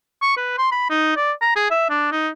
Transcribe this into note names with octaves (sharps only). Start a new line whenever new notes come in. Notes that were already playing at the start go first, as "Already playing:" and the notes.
C#6
B4
C6
B5
D#4
D5
A#5
G#4
E5
D4
D#4